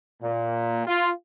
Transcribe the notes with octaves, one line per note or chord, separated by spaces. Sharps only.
A#2
F4